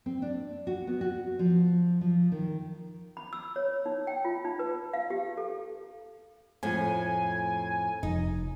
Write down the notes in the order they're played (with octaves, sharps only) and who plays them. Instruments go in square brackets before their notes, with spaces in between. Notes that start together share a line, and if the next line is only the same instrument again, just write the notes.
[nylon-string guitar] C4
D4
F#4
B3
F#4
F3
F3
D#3
[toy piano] B5
E6
C#5
D#4
G5
F4
D#4
B4
F5
G4
A4
[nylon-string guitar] F2 A2 [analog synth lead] G#5
[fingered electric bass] F1 [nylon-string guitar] D#4